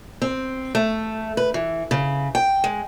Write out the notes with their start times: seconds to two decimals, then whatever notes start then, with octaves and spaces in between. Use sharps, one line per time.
0.22 C4
0.75 A3
1.37 B4
1.54 E3
1.91 C#3
2.35 G5
2.64 G#3